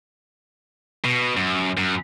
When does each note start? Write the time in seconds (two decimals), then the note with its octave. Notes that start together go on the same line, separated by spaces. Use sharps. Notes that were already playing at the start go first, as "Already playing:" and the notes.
1.05 B2
1.37 F#2
1.77 F#2